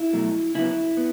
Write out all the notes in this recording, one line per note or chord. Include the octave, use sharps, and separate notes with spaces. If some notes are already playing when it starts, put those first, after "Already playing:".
Already playing: E4
B2 F#3 A3
C#3 F#3 B3 E4
B3